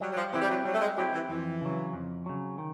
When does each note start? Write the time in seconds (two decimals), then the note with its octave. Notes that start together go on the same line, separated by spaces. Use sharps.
0.01 F#3 G3
0.11 F#3
0.17 F3
0.33 E3 C4 E4 G4
0.42 G3
0.50 F#3
0.65 F#3 G3
0.74 A3
0.81 G#3
0.98 F#3 C4 E4 G4
1.14 E3
1.29 F2 E3
1.62 C#3 F#3
1.93 F2
2.26 C#3 F#3
2.58 D#3